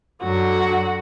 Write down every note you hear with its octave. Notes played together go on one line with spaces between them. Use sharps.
F#2 D3 F#3 F#4